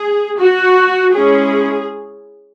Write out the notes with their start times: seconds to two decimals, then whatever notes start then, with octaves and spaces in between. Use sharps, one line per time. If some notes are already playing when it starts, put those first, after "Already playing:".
Already playing: G#4
0.38 F#4
1.13 G#3 C#4 E4 G#4